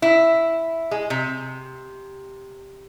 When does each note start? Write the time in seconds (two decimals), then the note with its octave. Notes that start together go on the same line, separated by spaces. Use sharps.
0.02 E4
0.91 G#3
1.10 C3